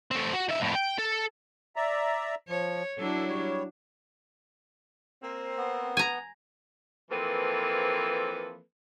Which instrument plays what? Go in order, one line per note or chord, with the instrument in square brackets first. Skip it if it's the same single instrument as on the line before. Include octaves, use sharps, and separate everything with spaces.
[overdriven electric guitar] A3 C4
F#4
D#3 E5
F2 A2
G5
A4
[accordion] D5 E5 A#5
[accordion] F3 [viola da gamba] C#5
[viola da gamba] F#3 D4 E4 [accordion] A4
[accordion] G3 C#5
[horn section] A#3 C4
[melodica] B3
[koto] G#5 A#5
[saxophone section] E3 F3 A#3 C4 A4 B4